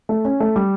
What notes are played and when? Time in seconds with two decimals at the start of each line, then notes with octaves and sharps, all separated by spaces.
0.09 A3
0.25 C#4
0.40 A3
0.56 G3